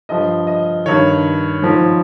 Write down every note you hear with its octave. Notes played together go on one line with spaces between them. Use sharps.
G2 F3 D#5
D#5
G2 D#3 C#5
G#2 F3